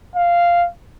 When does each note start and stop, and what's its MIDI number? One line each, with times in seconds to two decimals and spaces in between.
0.16 0.65 77